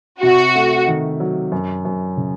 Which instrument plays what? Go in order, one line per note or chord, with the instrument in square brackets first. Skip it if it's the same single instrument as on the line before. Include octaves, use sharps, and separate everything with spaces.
[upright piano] C3 [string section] F#4
[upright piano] A3
D#3
F#3
F#2
F#2
C#3